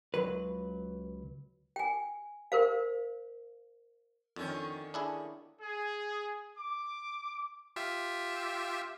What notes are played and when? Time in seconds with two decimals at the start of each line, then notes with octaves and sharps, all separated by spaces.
0.14 C#2 F#3 B4
1.76 G5 G#5
2.52 A#4 C5 F5
4.36 F2 D3 D#3 C#4
4.94 D4 E4 G#4
5.61 G#4
6.57 D6
7.76 F4 G4 E5